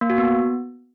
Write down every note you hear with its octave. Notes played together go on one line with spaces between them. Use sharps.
A#3
F#4
B3